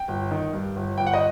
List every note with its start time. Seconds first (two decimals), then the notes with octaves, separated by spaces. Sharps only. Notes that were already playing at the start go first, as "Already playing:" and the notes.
Already playing: G5
0.08 G1
0.31 D#3
0.53 G2
0.76 G1
0.98 G1 G5
1.07 F#5
1.14 D#5